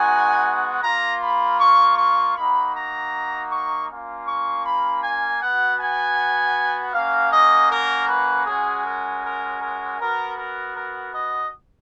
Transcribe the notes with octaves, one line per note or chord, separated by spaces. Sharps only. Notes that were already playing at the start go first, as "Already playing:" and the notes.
Already playing: G#3 B3 D#4 F#4 G#5
A#3 F4 A#5
B5
C#6
C#6
A#3 D#4 F#4 B5
A#5
C#6
A#3 C#4 F4
C#6
B5
G#5
B3 F#4 F#5
G#5
A#3 C#4 F#4 F5
D#5
A#4
B4
G#3 C#4 F#4 G#4
A#4
A#4
A#4
B3 F#4 A#4
A#4
A#4
D#5